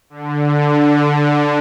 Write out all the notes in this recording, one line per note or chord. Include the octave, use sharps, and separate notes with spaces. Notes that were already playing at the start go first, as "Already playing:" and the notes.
D3